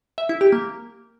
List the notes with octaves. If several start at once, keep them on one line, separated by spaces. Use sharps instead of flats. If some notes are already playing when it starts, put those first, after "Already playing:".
E5
E4
G4
A#3